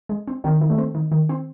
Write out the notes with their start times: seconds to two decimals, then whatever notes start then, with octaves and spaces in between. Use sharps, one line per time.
0.09 G#3
0.27 C4
0.44 D#3 C4
0.61 D#3
0.69 A3
0.78 C4
0.95 D#3
1.12 D#3
1.29 C4